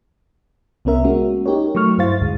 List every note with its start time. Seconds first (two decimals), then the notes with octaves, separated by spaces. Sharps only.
0.85 C2 B3 C#4 A#4 E5
1.04 G#3 A#3 C#4 F#4
1.46 D#4 G4 A#4 C#5
1.75 F#3 A3 C#6 F6
1.98 G2 E4 C5 F5 A6
2.21 D2 G#2 G#3